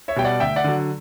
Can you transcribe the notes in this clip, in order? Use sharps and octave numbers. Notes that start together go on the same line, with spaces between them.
C#5 E5
B2 G3 G5
D5 F#5
D2 E5 G5
D5 F#5
D3 F#3